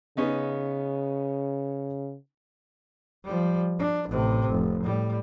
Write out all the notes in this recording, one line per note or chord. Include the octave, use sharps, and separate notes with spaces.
C#3 B3 C#4 D#4
F3 G3
D4
A1 C3
F1
A2 G3